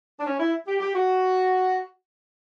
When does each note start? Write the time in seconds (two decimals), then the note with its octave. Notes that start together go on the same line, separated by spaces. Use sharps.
0.19 D4
0.25 C#4
0.40 E4
0.67 G4
0.80 G4
0.94 F#4